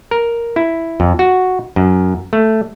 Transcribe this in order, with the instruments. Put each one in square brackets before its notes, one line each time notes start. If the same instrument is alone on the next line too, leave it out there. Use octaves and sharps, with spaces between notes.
[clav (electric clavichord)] A#4
E4
F2
F#4
F#2
A3